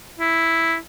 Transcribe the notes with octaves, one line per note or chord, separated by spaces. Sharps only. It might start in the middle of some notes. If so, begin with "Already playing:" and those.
E4